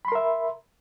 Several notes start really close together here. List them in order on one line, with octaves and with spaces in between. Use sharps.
B5 C6 A#4 E5